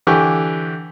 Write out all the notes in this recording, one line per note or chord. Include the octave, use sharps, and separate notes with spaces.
D3 E3 G4 C#6